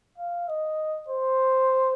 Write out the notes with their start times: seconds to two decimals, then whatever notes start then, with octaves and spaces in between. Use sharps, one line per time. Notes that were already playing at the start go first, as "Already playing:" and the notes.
0.18 F5
0.49 D#5
1.09 C5